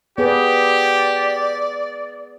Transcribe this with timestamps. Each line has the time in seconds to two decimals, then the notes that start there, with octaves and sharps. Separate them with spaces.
0.18 B3 G4 G#4 B4 D5